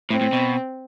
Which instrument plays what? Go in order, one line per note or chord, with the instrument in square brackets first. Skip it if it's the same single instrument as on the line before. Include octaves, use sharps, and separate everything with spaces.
[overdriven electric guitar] A2 [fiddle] C4
[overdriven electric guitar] A2
B2